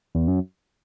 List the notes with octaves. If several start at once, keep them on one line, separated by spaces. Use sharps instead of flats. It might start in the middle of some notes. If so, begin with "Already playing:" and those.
E2
F#2